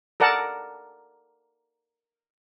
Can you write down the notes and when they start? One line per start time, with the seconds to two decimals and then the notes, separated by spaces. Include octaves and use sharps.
0.20 A4 A#4 D5 F#5 A5